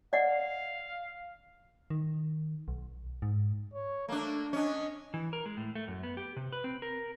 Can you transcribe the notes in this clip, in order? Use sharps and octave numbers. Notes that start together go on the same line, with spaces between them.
D5 D#5 F5 F#5
D#3
B1
G#2
C#5
A3 A#3 D4
C#4 D4 D#5
E3
A#4
G#3
A2
A3
F#2
B3
G4
C3
B4
C4
A#4